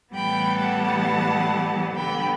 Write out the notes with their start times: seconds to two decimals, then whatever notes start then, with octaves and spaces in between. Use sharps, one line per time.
0.13 A2 E3 G3 B3 G5 B5
0.58 F#5 A5
1.95 D3 G3 B3 G5 B5